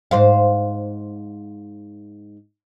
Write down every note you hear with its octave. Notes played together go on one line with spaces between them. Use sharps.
G#2 C5 F5